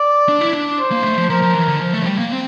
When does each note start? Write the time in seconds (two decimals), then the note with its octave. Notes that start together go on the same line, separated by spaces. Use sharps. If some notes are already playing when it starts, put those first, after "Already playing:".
Already playing: D5
0.28 D4
0.41 E4
0.53 D4
0.79 C5
0.91 A#3
1.04 A3
1.17 F3
1.29 F3 A#4
1.42 F3
1.55 E3
1.68 D3
1.81 F3
1.93 A3
2.02 F3
2.06 G3
2.19 A#3
2.32 C4